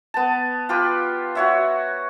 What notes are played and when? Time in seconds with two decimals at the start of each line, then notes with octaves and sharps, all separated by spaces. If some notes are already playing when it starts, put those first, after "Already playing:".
0.14 B3 A5
0.69 F4 G4 B4
1.35 F#4 C#5 E5